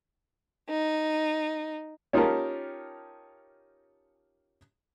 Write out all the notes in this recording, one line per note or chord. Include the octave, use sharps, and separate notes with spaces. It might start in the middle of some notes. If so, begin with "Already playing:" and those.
D#4
C#4 D#4 F4 G4 A#4 A5